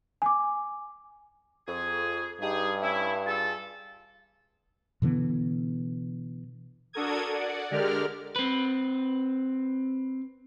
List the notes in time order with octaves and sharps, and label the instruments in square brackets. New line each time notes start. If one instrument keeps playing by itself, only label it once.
[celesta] G#5 D6
[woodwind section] F2 G#4
[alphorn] G2 [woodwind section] D#4 G4 G#4
[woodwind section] A3 C#4 E4
F4 G#4 A4
[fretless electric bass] B2 D3 E3 B3
[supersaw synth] D4 F#4 A4 A#4 D#6 G#6
D5 F#5
D3 G#3 G4 A#4 D5 F6
[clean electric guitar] C4 B4